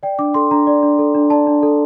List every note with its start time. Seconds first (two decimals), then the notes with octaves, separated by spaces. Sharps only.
0.03 D5 G5
0.19 D4 D6
0.34 A4 C6
0.51 D4 A#5
0.67 D5
0.83 D4
0.99 A4
1.15 D4
1.30 D5 A5
1.47 D4
1.63 A4